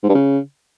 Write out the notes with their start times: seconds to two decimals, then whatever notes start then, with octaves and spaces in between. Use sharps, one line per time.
0.03 G#2
0.09 G2
0.14 C#3